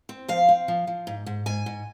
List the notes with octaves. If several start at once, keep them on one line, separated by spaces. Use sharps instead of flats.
C4
F3 F5
C4
F3
F3
G#2
G#2
G#2 G#5
G#2